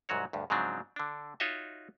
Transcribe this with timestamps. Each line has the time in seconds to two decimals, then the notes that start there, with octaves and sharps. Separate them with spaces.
0.09 C2 G#2 F#3 F#4 C#5
0.33 D2 G2
0.50 G#2 C#3 F3 F#3 C4 D4
0.96 D3 D4
1.40 D#4 F4 F#4 C#5 D#5 E5